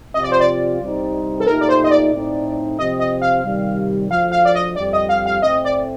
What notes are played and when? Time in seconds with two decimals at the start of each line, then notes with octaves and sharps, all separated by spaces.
0.14 C3 F3 C4 F4 D#5
0.23 D5
0.32 C5
0.40 D5
0.80 C2 C3 G3 C4 D#4
1.40 A4
1.45 A#2 A3 D#4 G4 A#4
1.61 D5
1.69 C5
1.84 D#5
1.91 D5
2.12 A2 A3 C4 D#4
2.79 C3 F3 C4 D#5
2.99 D#5
3.22 F5
3.44 C3 D#3 G3
4.10 D2 D3 F3 F5
4.32 F5
4.45 D5
4.55 D#5
4.76 F2 D3 G3 C4 G4 D5
4.93 D#5
5.09 F5
5.26 F5
5.42 A2 A3 C4 D#5
5.65 D5